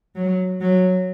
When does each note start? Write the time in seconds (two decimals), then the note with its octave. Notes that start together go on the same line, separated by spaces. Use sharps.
0.15 F#3
0.61 F#3